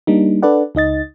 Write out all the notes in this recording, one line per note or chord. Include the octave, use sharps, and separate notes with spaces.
G3 A#3 D4 D#4
D4 A4 B4 D5 F#5
C#2 D#4 D#5 A6